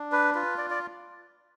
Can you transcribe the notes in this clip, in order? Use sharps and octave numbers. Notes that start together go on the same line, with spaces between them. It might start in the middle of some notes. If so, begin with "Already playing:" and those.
Already playing: D4
B4
F4 B4
D5
D5